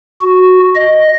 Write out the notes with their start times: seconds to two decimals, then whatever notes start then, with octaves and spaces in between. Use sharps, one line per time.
0.22 F#4
0.75 D#5